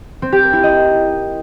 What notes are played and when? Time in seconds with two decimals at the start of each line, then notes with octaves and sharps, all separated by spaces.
0.22 C4
0.32 G4
0.43 A#4
0.53 E4
0.63 D#5